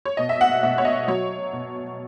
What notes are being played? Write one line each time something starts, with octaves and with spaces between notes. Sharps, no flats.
C#5
B2 D#5
E5
F#5
B2 E5
C#5
D#5
F#3 C#5
B2